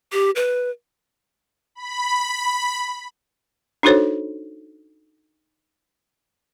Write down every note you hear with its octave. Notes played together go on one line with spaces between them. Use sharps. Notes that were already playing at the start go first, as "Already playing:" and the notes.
G4
B4
B5
D4 D#4 F#4 A4 C5 C#5